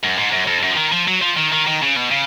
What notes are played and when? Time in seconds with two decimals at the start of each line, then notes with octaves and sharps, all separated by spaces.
0.03 F#2
0.17 G#2
0.32 F#2
0.47 F2
0.63 F#2
0.71 F3
0.77 D#3
0.92 F3
1.08 F#3
1.21 F3
1.37 D#3
1.52 D#3
1.67 D#3
1.82 C#3
1.96 B2
2.11 C#3